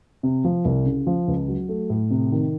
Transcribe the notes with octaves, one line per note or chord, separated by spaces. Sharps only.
C3
F3
C2
C#3
F3
C#2
F#3
A3
A2
C3
D#3